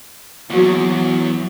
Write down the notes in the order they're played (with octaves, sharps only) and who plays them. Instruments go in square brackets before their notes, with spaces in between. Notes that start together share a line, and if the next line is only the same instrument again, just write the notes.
[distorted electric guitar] E2 [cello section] F#3 [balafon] A#3 F4 F#4